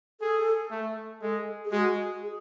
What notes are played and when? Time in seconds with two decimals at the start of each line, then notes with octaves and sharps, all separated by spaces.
0.21 G#4 A4
0.71 A3
1.22 G#3 A4
1.65 G#4
1.72 G#3 F#4
2.23 G#4